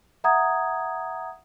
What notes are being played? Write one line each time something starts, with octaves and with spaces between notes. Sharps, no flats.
E5 F#5 A#5 D#6 G#6